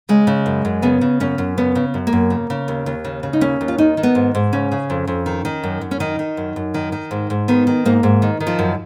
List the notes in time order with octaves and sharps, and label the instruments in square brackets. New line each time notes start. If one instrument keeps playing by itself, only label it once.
[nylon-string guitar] C#3 G#3
C#3
F#2
F#2
C#3 B3
C#3
F#2 C#4
F#2
C#3 B3
C#3
F#2
A#3
F#2
C#3
C#3
D#2
D#2
C#3
C#3
D#4
D#2 C#4
D#2
F4
D#3 D#4
D#3
B3
G#2
G#2
C#3 C#4
C#3
F2
F2
D#3
D#3
F#2
F#2
C#4
D#3 D#4
D#3
F#2
F#2
D#3
D#3
G#2
G#2
D#3 B3
D#3
G#2 A#3
G#2
D#3
D#3
F3
F#2